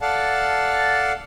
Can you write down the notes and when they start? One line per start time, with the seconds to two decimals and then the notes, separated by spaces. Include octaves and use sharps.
0.01 A4 D5 F5 F#5 A5